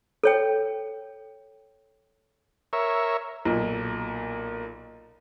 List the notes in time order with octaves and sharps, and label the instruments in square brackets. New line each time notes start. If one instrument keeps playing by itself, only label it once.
[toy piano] A4 C#5 G5
[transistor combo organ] A#4 C#5 E5
[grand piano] B1 A#2